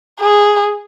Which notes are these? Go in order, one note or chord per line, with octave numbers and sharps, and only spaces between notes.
G#4